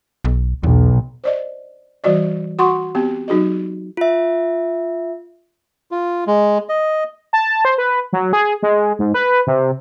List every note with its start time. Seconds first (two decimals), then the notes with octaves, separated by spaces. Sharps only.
0.25 B1
0.63 B1 E2
1.24 C5 D5 D#5
2.04 E3 G3 F#4 D5 D#5
2.59 F#4 F#5 C6 C#6
2.95 B3 C4 G4
3.28 F#3 D#4 F#4 G#4 D#5
3.97 F4 E5
5.91 F4
6.27 G#3
6.69 D#5
7.33 A5
7.65 C5
7.78 B4
8.13 F#3
8.33 G#4
8.63 G#3
8.99 G#2
9.14 B4
9.47 C3